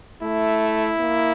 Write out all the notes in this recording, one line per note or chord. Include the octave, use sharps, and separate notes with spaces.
A3 E4
A#3